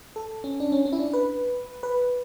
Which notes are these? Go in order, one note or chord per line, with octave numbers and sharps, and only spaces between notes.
A4
C#4
D4
C#4
C#4
E4
D4
B4
B4